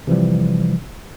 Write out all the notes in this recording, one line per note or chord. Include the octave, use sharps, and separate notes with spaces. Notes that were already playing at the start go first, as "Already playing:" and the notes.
C3 E3 F3 G3